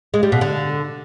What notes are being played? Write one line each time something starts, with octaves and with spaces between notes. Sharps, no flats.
G#3
G3
B2
D3